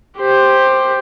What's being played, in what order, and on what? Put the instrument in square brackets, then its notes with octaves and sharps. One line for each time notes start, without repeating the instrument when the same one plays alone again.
[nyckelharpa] G4 C5